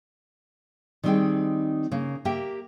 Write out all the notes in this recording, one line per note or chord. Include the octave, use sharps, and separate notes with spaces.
D#3 G3 C4 D#4 G#4 G5
C#3 A#3
A#3 G4 E5 G5